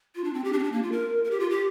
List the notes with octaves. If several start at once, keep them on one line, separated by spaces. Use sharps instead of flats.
F4
D4
C4
G4
D4
C4
D4
A#3
F4
A#4
A#4
G4
F4
G4